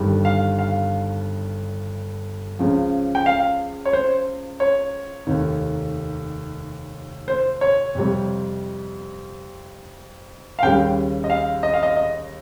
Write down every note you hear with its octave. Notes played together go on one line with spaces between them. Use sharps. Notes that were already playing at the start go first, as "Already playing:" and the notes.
Already playing: G1 G2 D#3 G3
F5
F5
C#2 C#3 F3
G5
F5
C#5
C5
C#5
F1 D#2 D#3
C5
C#5
F2 C3 G3
F5
D#2 C#3 G3 G5
D#5
F5
D#5
F5
D#5
D#5